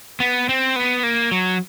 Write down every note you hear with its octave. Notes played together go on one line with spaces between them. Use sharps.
B3
C4
B3
A#3
F#3